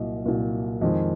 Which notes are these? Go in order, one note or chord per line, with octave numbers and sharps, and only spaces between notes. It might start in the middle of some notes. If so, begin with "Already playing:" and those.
Already playing: C2 A#2 F#3 D#5
C2 A#2 F#3
F2 D#3 G#3 D#5